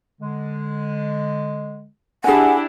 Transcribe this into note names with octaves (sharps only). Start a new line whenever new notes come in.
D3 G#3
D4 E4 G4 G#4 F#5 G#5